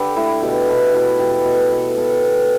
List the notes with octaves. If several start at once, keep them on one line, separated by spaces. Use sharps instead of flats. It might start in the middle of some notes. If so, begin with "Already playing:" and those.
Already playing: D3 G4 A4 B4 D5
A3 E4
B2 G4
B2 A4
B2 E4
G3 G4
B4
A4
B2
B4
B2
A4
B3 A4
B3